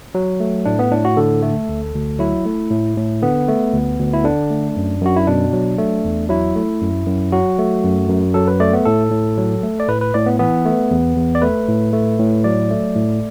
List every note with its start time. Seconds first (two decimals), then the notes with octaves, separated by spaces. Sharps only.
0.15 F#3
0.40 A3
0.65 A2 D4
0.79 B3
0.92 A2 D4
1.05 F#4
1.17 D3 A4
1.42 A3
1.69 D2
1.95 D2
2.19 F#3 E4
2.46 A3
2.71 A2
2.97 A2
3.22 D3 B3
3.48 A3
3.74 D2
3.99 D2
4.13 E4
4.24 D3 D4
4.50 A3
4.77 F#2
5.02 F#2 F#4
5.16 E4
5.27 B2 D4
5.53 F#3
5.78 A3
6.05 E2
6.29 F#3 E4
6.56 A3
6.81 F#2
7.07 F#2
7.32 F#3 F#4
7.58 A3
7.84 F#2
8.09 F#2
8.34 F#3 A4
8.48 B4
8.60 A3 D5
8.73 B3
8.85 A2 A4
9.11 A2
9.38 F#3
9.63 A3
9.80 D5
9.88 A2 B4
10.01 B4
10.14 A2 D5
10.26 B3
10.39 E3 B3
10.65 A3
10.91 E2
11.16 E2
11.35 D5
11.42 A3 B4
11.68 A2
11.93 A3
12.19 A2
12.44 F#3 D5
12.71 A3
12.96 A2